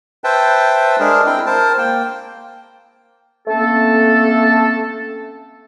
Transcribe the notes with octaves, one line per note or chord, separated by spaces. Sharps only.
B4 C5 E5 G5 A5
G#3 D4 G#4 A#4
C4 E4 G5
A#4 C5 A5
A#3 G5
A3 A#3 C4 C#4 A4